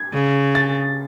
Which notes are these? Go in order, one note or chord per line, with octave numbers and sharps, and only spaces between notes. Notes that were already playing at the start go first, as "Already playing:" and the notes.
Already playing: G#6
C#3
A6